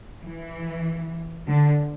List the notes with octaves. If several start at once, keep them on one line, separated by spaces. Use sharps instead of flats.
E3
D3